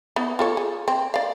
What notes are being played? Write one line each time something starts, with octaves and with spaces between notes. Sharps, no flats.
B3 E4
F4 A4 C#5
G#4
C4
D5 F5